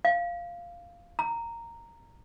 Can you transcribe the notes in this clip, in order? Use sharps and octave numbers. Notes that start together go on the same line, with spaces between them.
F5
A#5